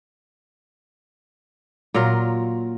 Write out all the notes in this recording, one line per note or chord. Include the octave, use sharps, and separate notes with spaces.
A#2 F#3 F4 A#4